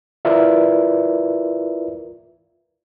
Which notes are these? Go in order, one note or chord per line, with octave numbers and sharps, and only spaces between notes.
E4 F4 A#4 B4 D5 E5